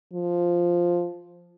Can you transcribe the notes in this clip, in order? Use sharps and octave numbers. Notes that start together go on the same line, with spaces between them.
F3